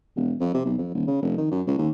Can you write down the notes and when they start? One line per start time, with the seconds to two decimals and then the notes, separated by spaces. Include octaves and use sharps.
0.16 E1
0.40 F2
0.54 C3
0.66 B1
0.78 F2
0.94 D#1
1.07 C#3
1.22 F1
1.38 D#3
1.51 F#2
1.67 C#2
1.79 D#2